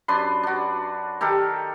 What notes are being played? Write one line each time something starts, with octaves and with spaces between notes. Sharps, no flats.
F#2 D4 B4 C6
D4 F#4
D#3 G4 A4 A#4